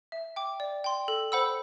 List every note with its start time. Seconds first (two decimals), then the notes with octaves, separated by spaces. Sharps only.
0.12 E5
0.36 G5 D6
0.60 D5
0.84 G5 C6
1.08 A4
1.32 C5 F#5 B5 E6